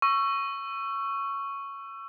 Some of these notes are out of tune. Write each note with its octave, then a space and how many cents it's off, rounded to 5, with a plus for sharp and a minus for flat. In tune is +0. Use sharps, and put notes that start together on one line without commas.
C#6 +0 E6 +30